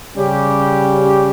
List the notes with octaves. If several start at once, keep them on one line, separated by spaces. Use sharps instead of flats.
C#3 G3 C#4 G4